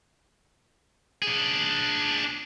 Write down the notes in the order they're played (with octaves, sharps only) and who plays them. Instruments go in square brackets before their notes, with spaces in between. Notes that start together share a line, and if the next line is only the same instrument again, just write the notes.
[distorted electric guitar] D4 G#4